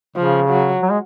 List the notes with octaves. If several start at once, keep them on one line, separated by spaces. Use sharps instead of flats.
C#3 F3
F#3
F#3
G#3